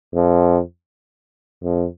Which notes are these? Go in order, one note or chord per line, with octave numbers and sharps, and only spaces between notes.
F2
F2